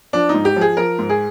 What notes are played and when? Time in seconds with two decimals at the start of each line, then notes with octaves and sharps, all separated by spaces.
0.13 F3 D4
0.29 G#2 D#4
0.45 G4
0.56 F3
0.61 G#4
0.77 F3 A#4
0.99 G#2
1.09 G#4